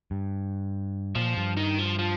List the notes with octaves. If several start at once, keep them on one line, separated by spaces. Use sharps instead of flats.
G2
A#2 F3
G2
D#3
F3
F3